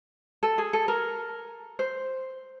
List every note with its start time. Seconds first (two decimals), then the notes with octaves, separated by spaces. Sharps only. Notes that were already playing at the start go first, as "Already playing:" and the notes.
0.43 A4
0.58 G#4
0.73 A4
0.88 A#4
1.79 C5